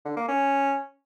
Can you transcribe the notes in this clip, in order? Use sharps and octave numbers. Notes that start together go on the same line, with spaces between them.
D3
A#3
C#4